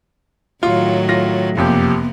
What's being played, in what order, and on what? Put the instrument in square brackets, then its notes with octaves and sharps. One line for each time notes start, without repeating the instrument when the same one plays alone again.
[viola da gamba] A2 D#3 F#3 [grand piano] F4
[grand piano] F4 A#6
[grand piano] F#1 F2 G4 [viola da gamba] C3 A#3 B3